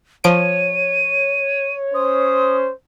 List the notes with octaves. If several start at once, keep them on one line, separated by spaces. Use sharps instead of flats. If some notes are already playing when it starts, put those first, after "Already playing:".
F3 C#5 D7 D#7
C#4 C5 D#6